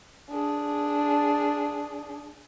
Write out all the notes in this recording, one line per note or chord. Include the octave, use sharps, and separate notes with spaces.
D4 G#4